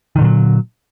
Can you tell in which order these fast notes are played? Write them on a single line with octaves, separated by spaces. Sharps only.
D#3 D3 A#2 F#3